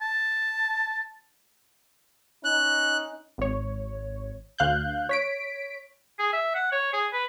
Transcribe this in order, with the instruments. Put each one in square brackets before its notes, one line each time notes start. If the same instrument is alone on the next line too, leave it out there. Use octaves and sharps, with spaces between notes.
[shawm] A5
[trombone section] C#4 D#4 [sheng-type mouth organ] F#6
[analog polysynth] G#1 C#5
D2 F5 F#6 G6
C#5 B6 D7
[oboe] G#4
E5
F#5
C#5
G#4
B4